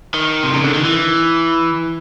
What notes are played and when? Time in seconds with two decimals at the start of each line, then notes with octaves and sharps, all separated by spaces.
0.14 D#3
0.43 C3
0.54 C#3
0.64 D3
0.74 D#3
0.84 E3